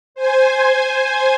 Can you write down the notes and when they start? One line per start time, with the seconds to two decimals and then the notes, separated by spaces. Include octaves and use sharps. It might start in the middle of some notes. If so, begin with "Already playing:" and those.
0.15 C5 G#5